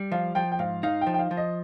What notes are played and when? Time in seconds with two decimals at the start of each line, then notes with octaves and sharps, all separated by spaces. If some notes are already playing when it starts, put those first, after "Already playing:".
Already playing: G3
0.12 F3 F5
0.35 F3 G5
0.52 G5
0.59 G#2 F5
0.83 D#4 F5
1.01 G5
1.07 F3
1.14 G5
1.19 F5
1.31 F3
1.37 D#5